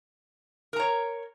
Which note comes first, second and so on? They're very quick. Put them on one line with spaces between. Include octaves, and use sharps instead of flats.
A#4 A#5 C#5